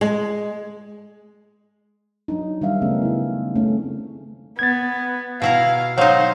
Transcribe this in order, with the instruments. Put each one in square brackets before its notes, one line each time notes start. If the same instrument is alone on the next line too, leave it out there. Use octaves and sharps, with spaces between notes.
[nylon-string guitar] G#3
[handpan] F#3 D4 D#4
D#3 G3 D4 E5 F5
C#3 A3 B3 C#4
C#3 E4
A3 C4 C#4
[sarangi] B3 [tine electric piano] G#6 A6
[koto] B2 E4 A#5 [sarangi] F5
[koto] F#3 D#4 [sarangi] C5 [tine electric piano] F5